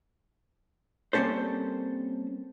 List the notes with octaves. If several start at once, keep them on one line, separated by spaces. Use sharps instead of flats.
G3 A#3 C4 C#4 A4 C5